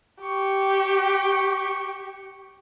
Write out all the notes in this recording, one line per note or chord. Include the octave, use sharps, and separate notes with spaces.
G4 C#6